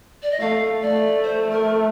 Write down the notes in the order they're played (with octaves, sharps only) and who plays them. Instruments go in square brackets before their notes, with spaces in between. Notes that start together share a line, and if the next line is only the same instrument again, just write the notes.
[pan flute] D5
D#5
[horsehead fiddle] A3 [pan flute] F5
[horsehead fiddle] A3 [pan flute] D5
[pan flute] C5
A#4